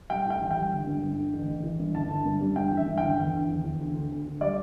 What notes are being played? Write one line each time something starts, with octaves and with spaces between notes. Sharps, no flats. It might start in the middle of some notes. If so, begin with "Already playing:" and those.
G3 G5
A2
G5
A1
G5
G3
G1
G2
G1
D3
A1
A1
E3
G2
G1 A5
G1
G2
G3
G2 G5
E3
E5
G2
G1 G5
E2 G5
D3
E2
E2
D2
D2
D2
D2
G3 D5